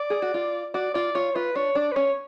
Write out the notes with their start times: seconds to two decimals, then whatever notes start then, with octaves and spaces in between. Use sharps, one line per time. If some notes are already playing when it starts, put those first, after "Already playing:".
Already playing: D5
0.10 G#4
0.22 F#4
0.34 F4
0.74 F#4 D5
0.94 F4 D5
1.15 F4 C#5
1.35 F4 B4
1.55 D4 C#5
1.75 D4 D5
1.92 B4
1.95 C#4 C#5